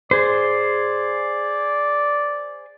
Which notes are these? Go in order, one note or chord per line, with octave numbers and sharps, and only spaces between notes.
G#4 C5 D5